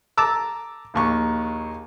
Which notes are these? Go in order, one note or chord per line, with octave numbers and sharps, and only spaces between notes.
A5 A#5 D6 E6
A#1 D#2 C#6